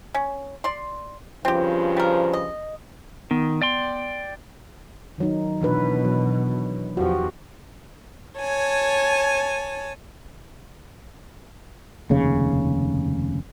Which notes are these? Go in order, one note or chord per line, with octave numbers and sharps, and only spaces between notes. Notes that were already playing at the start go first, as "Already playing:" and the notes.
C#4
D5 C6
G2 C#3 F3 C4 G4
G3 A#4
D#5
D#3 B3
D5 G5 C6
D#3 F#3 D#4
B2 E3 D4 B4
F#3
E2 F3 F#4 G4
C#5 G#5 A5
F1 D#2 C#3